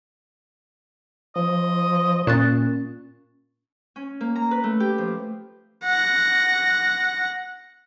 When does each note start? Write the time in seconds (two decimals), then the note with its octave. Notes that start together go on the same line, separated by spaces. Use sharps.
1.36 F3 D#5
2.27 A#2 C#4 F#6 A6
3.96 C#4
4.21 A#3
4.36 A#5
4.51 B4
4.64 A3
4.80 G4
4.98 F3
5.84 F#5 A#6